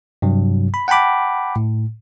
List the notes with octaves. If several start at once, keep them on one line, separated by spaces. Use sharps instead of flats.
G2 C3 F#3
B5
F#5 G5 A5 B5 D6
A2